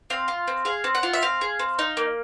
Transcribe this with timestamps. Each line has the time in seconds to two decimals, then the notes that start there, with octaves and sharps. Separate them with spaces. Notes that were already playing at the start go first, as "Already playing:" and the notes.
0.10 C4 F5
0.28 F4
0.48 C4
0.65 G#4 F5
0.84 C4
0.95 F#5
1.03 F4
1.13 E5
1.22 C4 F5
1.41 G#4
1.59 C4
1.79 D#4
1.97 A#3